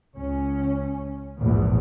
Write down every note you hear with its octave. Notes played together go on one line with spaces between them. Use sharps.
C#2 C#4
A#1 E2 G#2